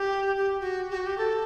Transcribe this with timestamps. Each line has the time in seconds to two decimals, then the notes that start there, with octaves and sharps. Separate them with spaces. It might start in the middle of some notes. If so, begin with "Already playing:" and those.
Already playing: G4
0.36 G4
0.60 F#4
0.91 G4
0.95 F#4
1.06 G4
1.18 A4